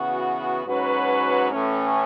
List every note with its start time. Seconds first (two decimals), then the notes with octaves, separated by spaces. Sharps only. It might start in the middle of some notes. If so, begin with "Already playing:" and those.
Already playing: C#3 E3 B3 F#4
0.64 G#2 F#3 C#4 F#4 B4
1.50 A2 E3 A3 C#4